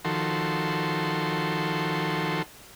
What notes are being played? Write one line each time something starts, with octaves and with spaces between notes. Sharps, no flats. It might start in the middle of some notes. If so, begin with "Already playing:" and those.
D#3 F3 F#4 A4 C6